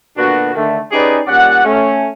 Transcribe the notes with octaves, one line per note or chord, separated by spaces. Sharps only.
A#2 D3 B3 D4 F#4
D3 D#3 A3
C#4 D#4 G4 G#4 B4 D5
A#2 G3 C#4 D5 F#5
A3 C#4